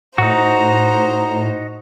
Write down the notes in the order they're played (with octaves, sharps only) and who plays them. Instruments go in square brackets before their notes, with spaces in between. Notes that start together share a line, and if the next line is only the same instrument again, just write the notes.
[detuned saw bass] A2 [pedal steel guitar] D#4 F#4 [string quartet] C5 [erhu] A#5